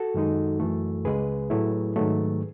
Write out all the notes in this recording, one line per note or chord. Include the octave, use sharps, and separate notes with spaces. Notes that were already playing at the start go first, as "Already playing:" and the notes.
Already playing: F#4 A4
F#2 D#3 G#3 D#4
F#2 E3 A3
C#2 C#3 G#3 G#4 B4
A2 F#3 A3 E4
G#2 D#3 F#3 A3